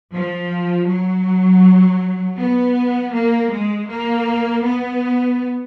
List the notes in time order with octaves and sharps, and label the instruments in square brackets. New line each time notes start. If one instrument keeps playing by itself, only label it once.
[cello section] F3
F#3
B3
A#3
G#3
A#3
B3